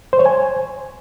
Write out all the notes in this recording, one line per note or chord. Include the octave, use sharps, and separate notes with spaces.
C5
C#5
G#5